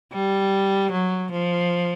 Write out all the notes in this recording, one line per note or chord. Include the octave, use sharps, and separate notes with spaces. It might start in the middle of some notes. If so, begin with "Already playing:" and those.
G3
F#3
F3